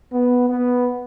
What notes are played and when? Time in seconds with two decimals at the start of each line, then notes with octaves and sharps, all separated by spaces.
0.13 B3
0.49 B3